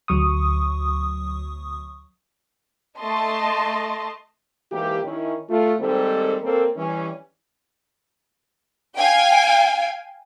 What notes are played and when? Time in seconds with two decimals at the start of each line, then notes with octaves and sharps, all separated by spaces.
0.08 D2 F#3 C#6 D#6
3.00 A3 D#5 A5 C6
4.71 G#2 E3 A#3 G4
5.04 D#3 C#4 E4
5.50 A3 F4
5.80 G#2 D#3 G3 A#3 C4 A4
6.43 A#3 C4 C#4 A4 A#4
6.77 E3 G3 C#4
8.98 F5 G5 G#5